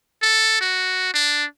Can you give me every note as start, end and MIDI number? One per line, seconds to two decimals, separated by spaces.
0.22 0.61 69
0.61 1.11 66
1.14 1.45 62